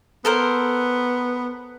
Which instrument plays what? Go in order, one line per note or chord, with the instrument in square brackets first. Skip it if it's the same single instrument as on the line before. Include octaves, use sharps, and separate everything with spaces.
[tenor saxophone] B3 [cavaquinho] A4 A#4 C5